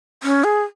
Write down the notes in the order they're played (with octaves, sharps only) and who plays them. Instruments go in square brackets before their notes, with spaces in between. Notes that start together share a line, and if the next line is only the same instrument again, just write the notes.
[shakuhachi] C#4
G#4